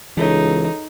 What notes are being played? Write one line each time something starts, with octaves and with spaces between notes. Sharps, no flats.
C#2 E3 D#4 G#4 A4 C#5